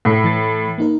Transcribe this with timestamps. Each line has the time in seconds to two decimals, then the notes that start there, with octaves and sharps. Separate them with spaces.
0.05 A2
0.24 E3 A6
0.78 A#3 D#4 A#4